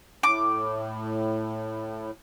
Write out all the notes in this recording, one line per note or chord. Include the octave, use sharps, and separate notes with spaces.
A2 D6